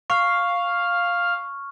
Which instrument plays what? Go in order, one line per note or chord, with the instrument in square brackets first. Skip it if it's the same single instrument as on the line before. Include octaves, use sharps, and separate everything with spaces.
[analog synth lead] F5 [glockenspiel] C#6 F6